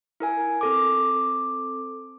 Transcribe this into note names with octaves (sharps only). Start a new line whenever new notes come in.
E4 A#4 G#5
C4 A4 D6